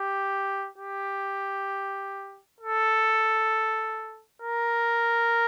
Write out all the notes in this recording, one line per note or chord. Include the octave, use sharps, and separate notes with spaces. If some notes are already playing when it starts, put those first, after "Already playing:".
Already playing: G4
G4
A4
A#4